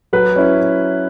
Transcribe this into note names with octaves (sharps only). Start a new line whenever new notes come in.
F#3 B4
C#4 E4